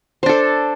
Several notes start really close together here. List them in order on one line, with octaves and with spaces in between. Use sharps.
C5 D4 A4